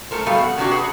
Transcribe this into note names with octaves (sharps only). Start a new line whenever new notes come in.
A3 A4 A#4 C5
B2 G3 A3 A4 F5
F#5
C3 D#3 F#3 D4 F#4 G4
G#4 B4 F#5